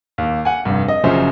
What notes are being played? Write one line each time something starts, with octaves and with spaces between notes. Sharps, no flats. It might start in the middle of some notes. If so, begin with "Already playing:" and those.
D#2
F#5 G#5
F1 G2
D#5
F#1 F3 F#3 C#4 C5 E5